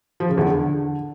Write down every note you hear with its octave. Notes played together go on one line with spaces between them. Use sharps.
F3
C#3
E2
D3